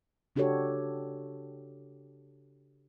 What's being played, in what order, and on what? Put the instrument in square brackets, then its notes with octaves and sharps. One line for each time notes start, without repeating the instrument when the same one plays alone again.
[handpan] C#3 D4 F#4 G4 A4 C#5